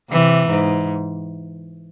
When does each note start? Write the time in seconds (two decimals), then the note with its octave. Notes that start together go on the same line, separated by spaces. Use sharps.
0.11 C3 E3
0.48 G#2